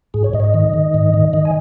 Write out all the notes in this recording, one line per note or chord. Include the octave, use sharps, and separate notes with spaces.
G#2 G#4
C#5
G#2 D#5
C#5
D#5
D#3
D#3
G#2
D#3
D#3 D#5
G#5